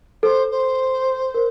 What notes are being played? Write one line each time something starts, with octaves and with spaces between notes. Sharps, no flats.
A4 C5
C5
A#4